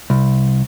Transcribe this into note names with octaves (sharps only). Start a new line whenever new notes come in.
C2